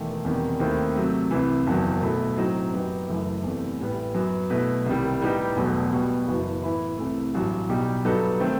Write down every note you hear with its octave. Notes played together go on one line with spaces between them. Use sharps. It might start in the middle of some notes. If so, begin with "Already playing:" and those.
Already playing: E1 E2 D#3 A3
E1 E2 C3 D#3 G3
D#2 D#3 A3 C4 E4
C3 F#3 A3
C2 C3 E3
F#1 E2 D#3 F#3
B2 A3 E4 A4
A2 F#3 C4 D#4
F#2 F#3 B3 D#4 G4
F#1 F#2 E3 A3
E2 C3 E3 A3
A1 A2 G3 B3
F#2 F#3 B3
B2 A3 E4 B4
C2 C3 D#3 G3
A2 G3 B3 D#4 G4
E1 E2 B2 F#3 A3
B2 G3 B3 F#4
F#1 F#2 E3 B3 F#4
A2 E3 B3 E4 B4
C2 C3 E3 A3
A1 G2 F#3
B1 B2 G3 D#4 G4
G2 F#3 B3 D#4 A4
D#3 A3 C4